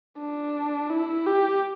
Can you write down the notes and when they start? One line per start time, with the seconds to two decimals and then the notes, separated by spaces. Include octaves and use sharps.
0.19 D4
0.90 E4
1.27 G4